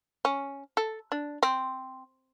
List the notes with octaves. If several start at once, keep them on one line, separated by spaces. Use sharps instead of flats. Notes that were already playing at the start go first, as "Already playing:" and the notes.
C#4
A4
D4
C4